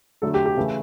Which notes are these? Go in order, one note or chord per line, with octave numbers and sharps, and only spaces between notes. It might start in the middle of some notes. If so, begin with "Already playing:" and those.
D3 F#3 A3 A4
G4
G4
C#3 E3 A3